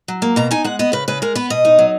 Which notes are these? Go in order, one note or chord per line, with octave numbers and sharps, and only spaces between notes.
F#3
A#3
B2 A#5
D#4 G#5
G#3 F#5
B3 D#5
C#3 B4
C#3 B4
G#3 A#4
B3 B4
B2 D#5
D#4
F#3